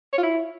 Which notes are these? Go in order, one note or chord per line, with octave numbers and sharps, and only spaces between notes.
C#5
F4
E4